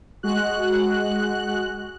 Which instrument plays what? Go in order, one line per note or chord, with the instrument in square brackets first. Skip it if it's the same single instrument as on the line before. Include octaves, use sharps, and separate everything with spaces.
[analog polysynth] G#3 F#4 F#6